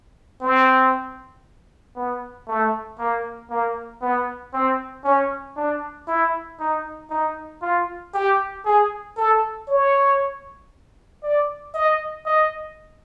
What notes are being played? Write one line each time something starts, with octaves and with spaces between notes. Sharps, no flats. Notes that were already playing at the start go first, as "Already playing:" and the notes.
C4
B3
A3
A#3
A#3
B3
C4
C#4
D4
E4
D#4
D#4
F4
G4
G#4
A4
C#5
D5
D#5
D#5